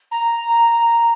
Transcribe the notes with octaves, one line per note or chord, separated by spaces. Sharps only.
A#5